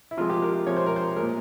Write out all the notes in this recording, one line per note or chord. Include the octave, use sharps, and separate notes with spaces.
E4
C3 F3 G#3 F4
G4
A#4
C3 F3 G#3 C#5
C5
A#4
C5
A#2 G#3 A#4